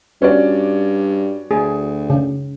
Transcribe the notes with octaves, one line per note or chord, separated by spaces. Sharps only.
G2 C#4 F#4 D5
D2 G#4
C#3